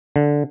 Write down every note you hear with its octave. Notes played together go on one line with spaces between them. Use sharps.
D3